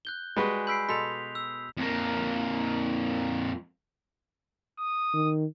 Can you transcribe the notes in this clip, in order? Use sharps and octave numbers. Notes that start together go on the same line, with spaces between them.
F#6 G6 G7
G3 G#3 F#4 G#4 B4
B5 E6 G6 B6 C7 D7
B2 A4 C6 B6 F7
E6
F2 A#3
D#6
D#3